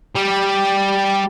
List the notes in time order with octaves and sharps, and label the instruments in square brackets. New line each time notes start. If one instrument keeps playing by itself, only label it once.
[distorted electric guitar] G3 G4